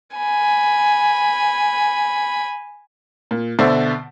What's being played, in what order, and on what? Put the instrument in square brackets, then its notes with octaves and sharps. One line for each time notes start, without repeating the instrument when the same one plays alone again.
[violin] G#5 B5
[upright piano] A#2
B2 D3 C5 D5 E5